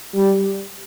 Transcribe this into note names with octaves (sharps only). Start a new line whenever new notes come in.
G3